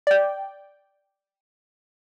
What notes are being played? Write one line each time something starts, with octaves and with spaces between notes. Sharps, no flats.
D5 G5